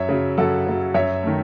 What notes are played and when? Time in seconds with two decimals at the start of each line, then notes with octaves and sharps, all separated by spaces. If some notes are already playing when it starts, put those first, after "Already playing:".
Already playing: F#2 C#5 E5
0.09 C#3 F#3
0.38 F#2 F#4 A4
0.67 C#3 F#3
0.94 F#2 C#5 E5
1.23 D#3 A3